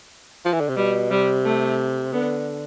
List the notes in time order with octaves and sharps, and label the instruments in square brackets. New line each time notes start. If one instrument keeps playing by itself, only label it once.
[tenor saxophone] F3
E3
D3
C3
[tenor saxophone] B2 [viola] G3
[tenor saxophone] C3 [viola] G3
[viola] A3
[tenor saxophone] D3 [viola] B3